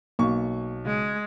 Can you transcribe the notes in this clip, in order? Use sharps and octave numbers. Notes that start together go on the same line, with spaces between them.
B1 A#3 C#6
C#3 G#3